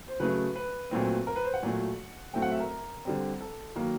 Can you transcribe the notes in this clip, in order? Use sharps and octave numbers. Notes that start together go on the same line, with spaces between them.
C5
C#3 F#3 A3 B4
B4
A#2 F#3 A3 C4
A#4
B4
C5
F#5
A#2 F#3 A3
A2 F#3 A3 C4 G5
F#5
E5
A#4
D3 G3 C4
A4
D#3 F#3 A#3